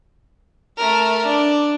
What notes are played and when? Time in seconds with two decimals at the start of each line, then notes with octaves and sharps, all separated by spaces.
0.77 A3 A#4
1.25 D4